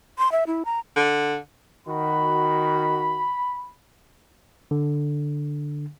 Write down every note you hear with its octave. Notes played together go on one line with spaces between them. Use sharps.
C6
E5
E4
A#5
D3
D#3 F#4 B5
D3